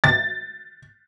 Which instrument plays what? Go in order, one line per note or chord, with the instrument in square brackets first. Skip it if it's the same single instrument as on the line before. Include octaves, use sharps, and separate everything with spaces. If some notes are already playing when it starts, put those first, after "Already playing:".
[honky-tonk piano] A6